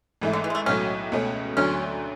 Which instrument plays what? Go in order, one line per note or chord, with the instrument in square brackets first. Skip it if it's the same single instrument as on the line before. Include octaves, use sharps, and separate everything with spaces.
[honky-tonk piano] G#1 G#2 E3 A3 E4
[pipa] D3
E3
G#3
A3
[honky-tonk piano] B1 A2 F#3 A3 [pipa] C#4
[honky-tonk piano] C#2 B2 A3 C#4
[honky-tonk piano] D2 D3 F#3 A3 [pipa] C#4